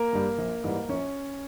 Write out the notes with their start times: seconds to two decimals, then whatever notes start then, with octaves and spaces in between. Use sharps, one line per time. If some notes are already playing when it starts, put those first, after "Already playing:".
Already playing: A#3 A#4
0.13 G2 G3
0.38 A#1
0.64 G#2 E3 G3
0.88 A#1 C#4 C#5